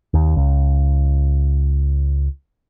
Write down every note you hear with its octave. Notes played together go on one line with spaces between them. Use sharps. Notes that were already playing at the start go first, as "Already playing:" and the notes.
D#2
C#2